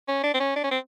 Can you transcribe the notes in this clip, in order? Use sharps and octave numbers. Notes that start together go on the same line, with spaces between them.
C#4
D4
C4
C#4
D4
C#4
C4